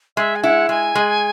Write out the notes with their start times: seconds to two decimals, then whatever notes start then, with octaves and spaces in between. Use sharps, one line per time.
0.17 G#3 E5
0.36 G#5
0.43 E4 F#5
0.69 G#3 G#5
0.95 G#3